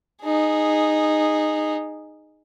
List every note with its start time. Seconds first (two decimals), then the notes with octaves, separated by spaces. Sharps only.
0.23 D#4 G#4